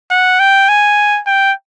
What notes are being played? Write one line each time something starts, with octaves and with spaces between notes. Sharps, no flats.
F#5
G5
G#5
G5